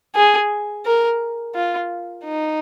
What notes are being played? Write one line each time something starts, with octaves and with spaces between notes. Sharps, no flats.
G#4
A#4
F4
D#4